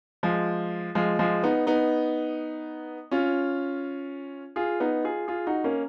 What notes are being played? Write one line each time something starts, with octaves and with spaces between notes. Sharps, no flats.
F3 G#3
F3 G#3
F3 G#3
B3 D#4
B3 D#4
C#4 F4
F4 G#4
B3 D#4
F4 G#4
F4 G#4
D#4 F#4
A#3 C#4